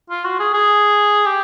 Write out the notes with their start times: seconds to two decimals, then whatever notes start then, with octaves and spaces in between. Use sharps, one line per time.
0.10 F4
0.25 F#4
0.39 G#4
0.54 G#4
1.26 G4